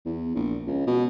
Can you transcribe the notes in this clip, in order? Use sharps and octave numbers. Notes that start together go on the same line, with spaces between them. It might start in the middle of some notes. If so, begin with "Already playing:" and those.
E2
A#1
C#2
B2